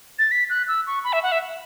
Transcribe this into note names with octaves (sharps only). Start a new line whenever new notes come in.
A6
B6
F#6
E6
C#6
B5
E5
F#5
E5